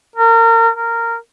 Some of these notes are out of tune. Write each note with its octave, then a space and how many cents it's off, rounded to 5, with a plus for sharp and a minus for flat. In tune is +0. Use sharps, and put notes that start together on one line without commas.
A#4 -30
A#4 -15